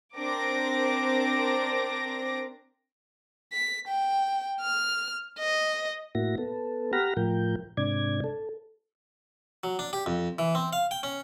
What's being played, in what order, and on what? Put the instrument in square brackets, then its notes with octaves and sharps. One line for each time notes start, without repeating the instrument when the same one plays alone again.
[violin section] C4 D4 A#4 D6 A#6
[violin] B6
G5
F6
D#5
[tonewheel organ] A2 A#3 E4 F#4 A#6
B3 A4
G4 F#5 A#5 B5 F6 A#6
A2 F3 A#4 G5
G#2 C3 D4 D5 G#6
A4
[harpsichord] F#3
D4
G4
F2
E3
C4
F5
G5
C#4